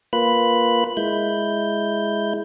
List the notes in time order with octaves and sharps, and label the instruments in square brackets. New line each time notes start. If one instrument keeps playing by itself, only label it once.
[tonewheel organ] A#3 F4 B4 B5 F#6
G#3 E4 G6